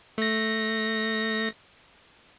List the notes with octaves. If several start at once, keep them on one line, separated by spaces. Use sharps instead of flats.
A3 A#6